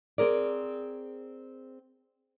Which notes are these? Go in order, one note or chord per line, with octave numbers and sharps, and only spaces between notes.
C4 G#4 A#4 D5